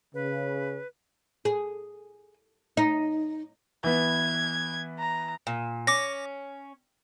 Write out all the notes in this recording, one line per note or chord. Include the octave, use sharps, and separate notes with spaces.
C#3 B4
G#4
D#4
E3 B3 G#6
A#5
A#2
C#4 D6 A#6